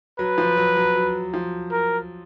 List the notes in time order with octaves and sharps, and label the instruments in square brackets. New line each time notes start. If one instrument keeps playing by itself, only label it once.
[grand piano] F#3 [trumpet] B4
[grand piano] F3
F#3
F#3
F#3
F3
[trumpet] A#4